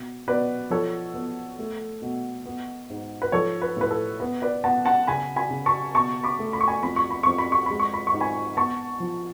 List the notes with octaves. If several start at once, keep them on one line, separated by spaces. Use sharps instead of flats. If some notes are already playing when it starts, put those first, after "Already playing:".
Already playing: B2
B2 B4 D5
F3 A4 C#5
B3
A3
B2
B3
G#2
B4
F3 A4 C#5
B4
A2 B4
A4
B3 B4
B4 D5
B3 F#5 A5
F#5 A5
C#3 G#5 B5
G#5 B5
C#3
A5 C#6
B2 A5 C#6
B5 D6
A3
B5
C#6
G#5 B5
F2 B5
C#6
B5
F2 C#6
B5
C#6
G#3 B5
C#6
B5
C#6
G#2
G#5 B5
B3 A5 C#6
F3